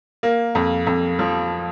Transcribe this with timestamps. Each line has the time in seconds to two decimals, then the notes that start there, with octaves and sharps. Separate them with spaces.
0.23 A#3
0.55 F2
0.87 F2
1.19 F3